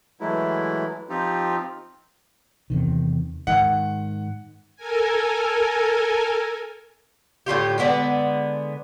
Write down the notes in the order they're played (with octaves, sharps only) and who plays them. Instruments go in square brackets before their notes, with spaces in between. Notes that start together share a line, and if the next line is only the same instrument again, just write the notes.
[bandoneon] E3 F#3 G#3 A3 E4
F3 C4 D#4 F4 G4
[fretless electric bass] E2 C3 D#3
[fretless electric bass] G#2 D#3 [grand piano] F#5
[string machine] A4 A#4 G#5
[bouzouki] A2 D3 F4 G4
D3 G#3 B3 D5